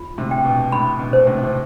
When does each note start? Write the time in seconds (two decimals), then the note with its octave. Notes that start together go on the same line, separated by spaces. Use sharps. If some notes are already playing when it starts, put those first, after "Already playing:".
Already playing: F4
0.18 A2 C3
0.31 G5
0.45 B2
0.72 A2 B5
0.99 B2
1.13 C5
1.27 A2 C3
1.43 C3